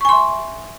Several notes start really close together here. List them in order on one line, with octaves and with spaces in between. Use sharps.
C#6 G#5 C6 E5